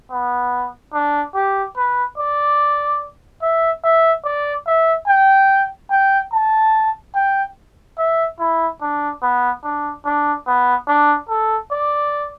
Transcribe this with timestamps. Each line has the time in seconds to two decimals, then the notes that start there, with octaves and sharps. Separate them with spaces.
0.11 B3
0.93 D4
1.35 G4
1.76 B4
2.18 D5
3.42 E5
3.84 E5
4.25 D5
4.66 E5
5.07 G5
5.91 G5
6.32 A5
7.15 G5
7.98 E5
8.39 E4
8.81 D4
9.22 B3
9.63 D4
10.05 D4
10.46 B3
10.88 D4
11.29 A4
11.71 D5